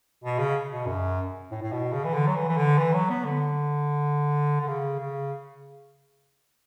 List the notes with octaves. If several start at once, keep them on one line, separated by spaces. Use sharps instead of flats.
B2
C#3
B2
F#2
A2
A2
B2
C#3
E3
D3
F#3
E3
E3
D3
E3
F#3
B3
D3
D3
C#3
C#3